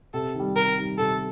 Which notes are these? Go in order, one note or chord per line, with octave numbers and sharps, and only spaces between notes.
C3 A4
D#3 G3
C3 A#4
D#3 G3
C3 A4